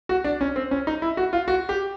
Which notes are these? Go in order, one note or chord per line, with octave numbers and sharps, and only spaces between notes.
F#4
D4
C#4
C4
C#4
D#4
E4
F#4
F4
F#4
G4